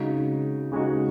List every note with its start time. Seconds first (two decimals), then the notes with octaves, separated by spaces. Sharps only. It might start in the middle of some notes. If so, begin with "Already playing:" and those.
Already playing: C#3 G#3 D#4 F#4
0.72 C#3 G#3 D#4 F#4